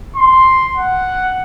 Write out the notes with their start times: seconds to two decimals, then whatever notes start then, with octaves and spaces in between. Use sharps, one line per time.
0.16 C6
0.77 F#5